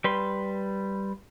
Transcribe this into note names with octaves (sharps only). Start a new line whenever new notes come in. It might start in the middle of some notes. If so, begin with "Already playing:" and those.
G3 B4 C6